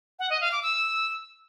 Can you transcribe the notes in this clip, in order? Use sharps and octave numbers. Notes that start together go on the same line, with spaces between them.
F#5
D#5
F5
D6
E6